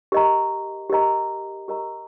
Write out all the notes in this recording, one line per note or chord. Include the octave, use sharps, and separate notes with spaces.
G4 A#4 D#5 A#5
G4 A#4 D#5 A#5
G4 A#4 D#5 A#5